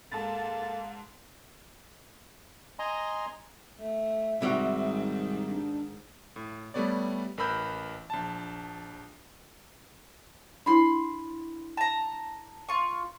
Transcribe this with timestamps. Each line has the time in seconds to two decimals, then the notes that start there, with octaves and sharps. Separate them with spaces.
0.12 G#2 A#3 A4 A5 A6
2.79 D#5 G#5 A#5 C6
3.79 A3 E5
4.42 G#2 C3 D#3 G3 F#4
5.45 D4
6.36 A2
6.74 G3 A3 B3 C#5 D5
7.38 A1 A#4 B4 B5 E6 G6
8.10 A#1 A5
10.66 D4 E4 B5 C6
11.77 A5 A#5
12.68 F4 C#6